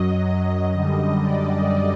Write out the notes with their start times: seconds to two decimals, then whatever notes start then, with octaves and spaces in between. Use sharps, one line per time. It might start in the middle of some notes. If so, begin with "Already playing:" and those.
Already playing: F#2 F#3 D#5
0.22 D#5
0.71 F#2 D3 G3
1.19 D5